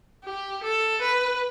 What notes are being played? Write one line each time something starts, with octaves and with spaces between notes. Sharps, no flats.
G4
A4
B4